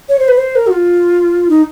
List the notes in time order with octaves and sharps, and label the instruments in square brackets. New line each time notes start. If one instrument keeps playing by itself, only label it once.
[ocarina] C#5
C5
B4
C5
A#4
F#4
F4
D#4